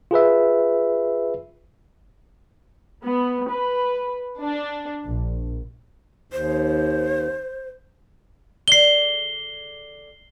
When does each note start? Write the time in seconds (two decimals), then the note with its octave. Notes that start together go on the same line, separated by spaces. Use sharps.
0.11 F4 G#4 B4 E5
3.04 B3
3.52 B4
4.43 D4
5.06 A#1
6.32 D#2 C5
8.68 D3 G#4 D5 C7 G7